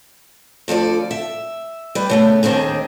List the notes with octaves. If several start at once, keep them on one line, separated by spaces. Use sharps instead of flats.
D2 F3 A4 D5
E5
G3 B4
C#3 A3 B3
D#2 D#3 C4 D4 G#4